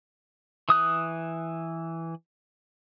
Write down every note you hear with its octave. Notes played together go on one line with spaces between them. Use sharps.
E3 D#6 F#6